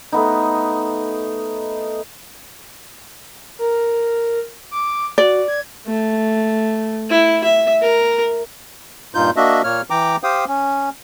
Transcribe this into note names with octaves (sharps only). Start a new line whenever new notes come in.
A3 B3 D#4
A#4
D6
F#4 D5
G#6
A3
E4
E5
A#4
G2 A#2 D#4 F4 G6
A#3 D4 F#4 D#5 E5
A#2 A#3 C#5 F6
E3 G5 A#5 D6
G4 C5 F5 G5 D#6
C#4